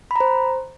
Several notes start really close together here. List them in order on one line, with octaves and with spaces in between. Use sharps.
B5 A#5 C5